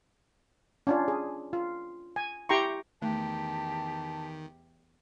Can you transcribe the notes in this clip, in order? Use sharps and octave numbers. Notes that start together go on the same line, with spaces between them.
C#4 D4 F4
G#4
F4
G#5
E4 G4 G5 A#5 C6 C#6
E2 D#3 A3 G4 A5